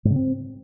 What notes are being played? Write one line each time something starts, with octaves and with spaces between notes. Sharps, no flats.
G#2
C#3
C4